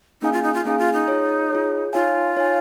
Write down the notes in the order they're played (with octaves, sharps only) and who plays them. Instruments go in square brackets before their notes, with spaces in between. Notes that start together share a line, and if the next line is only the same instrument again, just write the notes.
[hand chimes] A#3 C#4 G#4 F5 G#5 [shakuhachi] D#4
[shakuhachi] F4
D#4
F4
[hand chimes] A#3 C#4 G#4 F5 G#5 [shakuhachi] D#4
[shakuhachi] F4
D#4
[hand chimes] F4 G#4 C#5
F4 G#4 C#5
[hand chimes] D#4 C#5 F5 G#5 [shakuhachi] F4
[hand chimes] D#4 C#5 F5 G#5